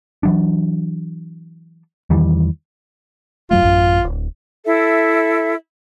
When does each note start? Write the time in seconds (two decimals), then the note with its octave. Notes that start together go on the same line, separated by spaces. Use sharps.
0.23 E3 F#3 D4
2.10 E2 D#3 E3 G3
3.51 F#2 F#3 A3 F4
3.62 A1 F#2
4.04 D1
4.65 E4 A4 E5